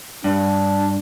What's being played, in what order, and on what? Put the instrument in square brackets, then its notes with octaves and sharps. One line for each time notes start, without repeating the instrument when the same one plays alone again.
[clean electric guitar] G2 [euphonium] D4